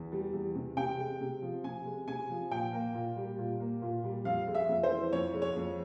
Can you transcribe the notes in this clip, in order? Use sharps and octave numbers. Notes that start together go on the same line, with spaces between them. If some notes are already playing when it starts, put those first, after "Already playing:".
Already playing: E2
G3
E2
C3
C3 G5
G#3
C3
F3
C3 G#5
G#3
C3 G#5
F3
A#2 G5
A#3
A#2
G3
A#2
A#3
A#2
G3
F2 F5
G#3
E5
F2
C5
E3
F2 C#5
G#3
C#5
F2